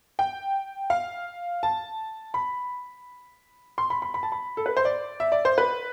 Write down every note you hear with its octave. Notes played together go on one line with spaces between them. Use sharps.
G5
F5
A5
B5
C6
B5
B5
B5
A5
B5
A4
B4
C5
D5
E5
D5
C5
B4